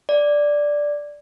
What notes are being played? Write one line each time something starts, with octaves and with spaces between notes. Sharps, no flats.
D5